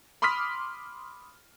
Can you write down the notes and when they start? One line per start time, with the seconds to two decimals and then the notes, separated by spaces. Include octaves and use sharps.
0.22 B5 C6 D6 D#6 F6 B6